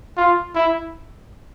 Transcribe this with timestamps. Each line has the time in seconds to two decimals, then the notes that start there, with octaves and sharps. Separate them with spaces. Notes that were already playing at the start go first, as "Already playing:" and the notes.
0.17 F4
0.55 E4